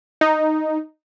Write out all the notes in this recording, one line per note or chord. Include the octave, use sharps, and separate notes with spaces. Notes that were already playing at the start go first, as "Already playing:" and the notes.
D#4